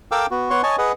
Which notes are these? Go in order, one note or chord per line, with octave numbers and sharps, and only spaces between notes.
A4 A#4 F5 G5 D6 E6
B3 F#4
B3 C#5 F#5 C6 C#6
C#5 D#5 G#5 A5 C#6
G#4 B4 D#5 F#5